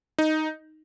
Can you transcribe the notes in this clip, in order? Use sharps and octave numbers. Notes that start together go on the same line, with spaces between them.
D#4